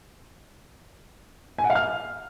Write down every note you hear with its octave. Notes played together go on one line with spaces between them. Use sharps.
G#5
F#5
F5
F6